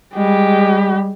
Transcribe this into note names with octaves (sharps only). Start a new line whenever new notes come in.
G3 G#3 G4